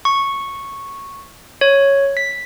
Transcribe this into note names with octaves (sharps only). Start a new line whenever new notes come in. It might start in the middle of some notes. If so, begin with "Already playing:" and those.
C#6
C#5
B6